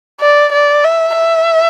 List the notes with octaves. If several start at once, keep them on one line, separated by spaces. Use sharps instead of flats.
D5
D5
E5
E5